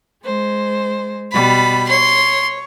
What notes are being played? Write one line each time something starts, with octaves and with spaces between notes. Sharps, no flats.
G#3 C5
B2 G3 B5
C#5 C6